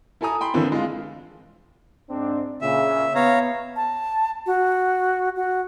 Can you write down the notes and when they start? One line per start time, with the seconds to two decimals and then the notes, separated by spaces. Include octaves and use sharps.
0.21 E4 A4 G#5 A#5 D#6
0.41 G5 B5 C6
0.54 D3 E3 A#3 C4 E4
0.72 G#3 F4
2.10 G#2 C4 D4
2.61 A#2 C#3 E5
3.15 B3 C#5 F5 A#5
3.76 A5
4.46 F#4
5.36 F#4